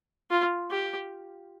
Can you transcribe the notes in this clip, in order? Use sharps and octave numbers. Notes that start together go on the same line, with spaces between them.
F4
G4